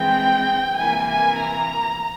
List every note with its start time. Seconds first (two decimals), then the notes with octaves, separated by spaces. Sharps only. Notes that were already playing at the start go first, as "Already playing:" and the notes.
Already playing: E3 G#3 C4 G5
0.77 C3 E3 A#3 E4 G#5
1.09 G#5
1.40 A#5